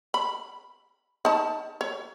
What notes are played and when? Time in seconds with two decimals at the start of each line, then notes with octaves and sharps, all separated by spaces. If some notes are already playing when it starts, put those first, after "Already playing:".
0.14 B5
1.25 D#4 A5
1.81 C#5